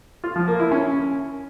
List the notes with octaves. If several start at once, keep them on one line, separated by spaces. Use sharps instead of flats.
F4
F3
A#3
E4
C#4